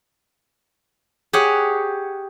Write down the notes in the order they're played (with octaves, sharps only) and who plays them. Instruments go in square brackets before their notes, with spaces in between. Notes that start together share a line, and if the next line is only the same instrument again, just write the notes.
[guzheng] G4 G#4 C#5 F#5